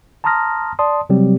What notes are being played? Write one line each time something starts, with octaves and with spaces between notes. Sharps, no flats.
A5 A#5 C6 D#6 F6 A#6
D5 A5 C6 D#6
C3 F#3 G3 C4 G4